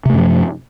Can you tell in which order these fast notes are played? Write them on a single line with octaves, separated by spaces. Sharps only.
C3 A3 F#2 F3